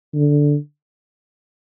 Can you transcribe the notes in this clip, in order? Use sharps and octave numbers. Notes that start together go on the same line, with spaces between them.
D3